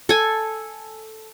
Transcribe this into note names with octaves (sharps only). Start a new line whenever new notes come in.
A4 G#5